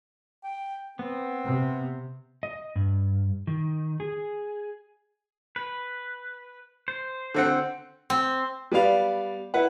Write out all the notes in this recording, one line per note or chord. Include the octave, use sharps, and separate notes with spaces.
G5
B3 C4
C3
D#5
G2
D#3
G#4
B4
C5
D3 C4 F#5
C4
G3 B3 D5 F5
E4 B4 F#5